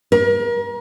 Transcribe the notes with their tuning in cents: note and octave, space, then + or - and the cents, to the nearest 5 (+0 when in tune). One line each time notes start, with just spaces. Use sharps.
A#4 +35